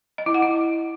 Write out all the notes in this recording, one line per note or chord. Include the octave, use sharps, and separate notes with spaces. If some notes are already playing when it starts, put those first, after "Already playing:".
D#5
E4
F#5
E4